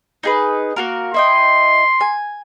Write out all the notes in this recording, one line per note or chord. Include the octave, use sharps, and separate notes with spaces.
D#4 G#4 B4
A#3 F#4 A#4
E4 D#5 G5 C6
G#5